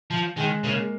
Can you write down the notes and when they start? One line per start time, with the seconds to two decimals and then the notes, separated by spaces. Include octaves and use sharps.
0.11 F3
0.37 D#3 G#3
0.64 C#3 A#3